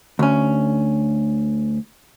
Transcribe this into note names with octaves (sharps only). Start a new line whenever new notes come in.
D2 C#4